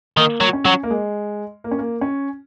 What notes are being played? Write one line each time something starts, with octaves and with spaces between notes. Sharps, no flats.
D#3 A#3
F#3
C#4
F#3
A#3
G#3
A#3
C#4
A#3
C#4